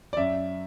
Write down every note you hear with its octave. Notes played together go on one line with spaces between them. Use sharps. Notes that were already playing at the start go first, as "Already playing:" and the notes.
D5
F#2 E5